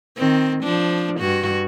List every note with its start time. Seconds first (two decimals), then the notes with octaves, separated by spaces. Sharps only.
0.17 D#3 C4
0.63 F3 D4
1.19 G2 F#4